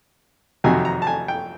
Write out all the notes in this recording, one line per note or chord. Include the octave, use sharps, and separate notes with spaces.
F2 C3 D#3 F#3 G#5
A#5
A5
G#5
G5